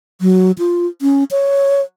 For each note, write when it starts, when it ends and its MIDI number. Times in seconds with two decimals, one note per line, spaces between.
0.21 0.51 54
0.58 0.87 65
1.02 1.24 61
1.31 1.82 73